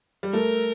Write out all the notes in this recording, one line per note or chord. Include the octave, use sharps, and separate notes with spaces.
G3
A3 A#4